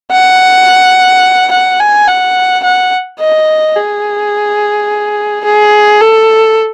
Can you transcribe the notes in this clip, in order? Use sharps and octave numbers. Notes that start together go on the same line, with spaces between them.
F#5
F#5
G#5
F#5
F#5
D#5
G#4
G#4
A4